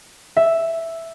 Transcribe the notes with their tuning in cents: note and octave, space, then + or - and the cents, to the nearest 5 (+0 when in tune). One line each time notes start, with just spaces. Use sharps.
E5 +0